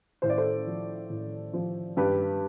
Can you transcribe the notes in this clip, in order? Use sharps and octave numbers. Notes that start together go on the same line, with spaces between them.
A2 C5
D5
A4 C5
F3
A2
F3
G2 G4 B4